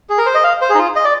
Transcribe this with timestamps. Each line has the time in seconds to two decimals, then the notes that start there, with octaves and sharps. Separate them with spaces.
0.09 G#4
0.18 A#4
0.26 C5
0.35 D#5
0.44 F5
0.61 C5
0.70 G#4
0.75 D#4
0.78 F4
0.96 D#5
1.05 D5